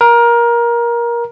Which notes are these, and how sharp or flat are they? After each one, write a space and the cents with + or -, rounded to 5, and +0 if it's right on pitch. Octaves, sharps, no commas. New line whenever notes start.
A#4 +20